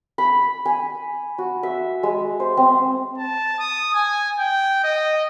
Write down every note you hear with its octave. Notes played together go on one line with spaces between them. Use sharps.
B5
G#5
F#4
E5
G#3
C5
C4
A5
D#6
G#5
G5
D#5